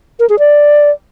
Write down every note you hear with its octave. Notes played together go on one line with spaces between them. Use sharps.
A#4
G#4
D5